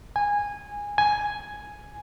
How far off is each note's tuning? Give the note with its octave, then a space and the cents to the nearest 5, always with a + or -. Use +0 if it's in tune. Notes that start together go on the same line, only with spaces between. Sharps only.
G#5 -15
G#5 +5